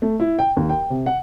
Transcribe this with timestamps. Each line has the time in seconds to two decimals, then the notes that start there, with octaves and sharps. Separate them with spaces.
0.02 A3
0.20 E4
0.39 G5
0.57 D#2
0.69 G5
0.90 C3
1.06 F#5